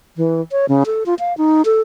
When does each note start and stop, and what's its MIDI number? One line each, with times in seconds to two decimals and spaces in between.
0.17 0.41 52
0.52 0.66 73
0.69 0.84 49
0.86 1.04 69
1.06 1.14 65
1.19 1.36 77
1.38 1.62 63
1.65 1.81 69